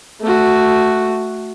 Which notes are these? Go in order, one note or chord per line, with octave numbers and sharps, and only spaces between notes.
A3 F#4